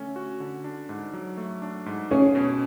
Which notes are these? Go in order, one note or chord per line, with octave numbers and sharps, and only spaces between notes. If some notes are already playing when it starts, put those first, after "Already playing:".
Already playing: D3 A3 C#4
F#4
D3
D4
G#2
F#3
A3
D4
G#2
C#4 G#4
B2